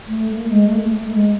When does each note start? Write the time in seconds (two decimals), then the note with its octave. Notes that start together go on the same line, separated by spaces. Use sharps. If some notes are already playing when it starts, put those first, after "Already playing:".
0.08 A3
0.31 A3
0.37 A#3
0.46 A3
0.51 G#3
0.67 A3
0.75 A#3
0.81 A3
0.95 A3
1.06 A3
1.14 G#3